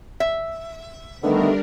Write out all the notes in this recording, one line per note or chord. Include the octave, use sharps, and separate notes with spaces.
E5
D3 D#3 G3 A3 B3 D4 A#4